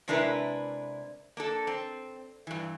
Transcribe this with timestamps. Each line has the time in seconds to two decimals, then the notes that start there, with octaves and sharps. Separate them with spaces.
0.08 C3 G#3 D4 E4 A#4 B4
1.37 A#3 D4 A4
1.67 C4
2.47 G2 E3